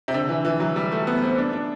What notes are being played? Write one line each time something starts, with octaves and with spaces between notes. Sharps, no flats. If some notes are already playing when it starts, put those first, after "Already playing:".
C3
D3
E3
E3
F#3
G3
A3
B3
C4
D4
D4